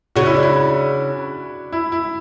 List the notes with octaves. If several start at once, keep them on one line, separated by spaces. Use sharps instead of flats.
C#3 F#4
E4
D4
E4
E4
E4